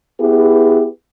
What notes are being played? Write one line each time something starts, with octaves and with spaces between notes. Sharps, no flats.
B3 E4 G4 G#4 B4